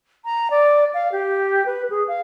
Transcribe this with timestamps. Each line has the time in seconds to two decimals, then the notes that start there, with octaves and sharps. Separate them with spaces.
0.25 A#5
0.50 D5
0.94 F5
1.12 G4
1.66 B4
1.90 G#4
2.08 F5